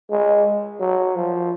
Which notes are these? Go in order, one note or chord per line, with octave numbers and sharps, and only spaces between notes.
G#3
F#3
F3